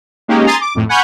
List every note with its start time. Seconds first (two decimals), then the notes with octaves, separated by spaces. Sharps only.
0.28 G#3 A#3 C#4 D#4 G4
0.46 G#5 A#5 C6 D#6 A6
0.61 D6
0.75 F2 A2
0.89 F#5 G#5 B5 C#6 F6 G6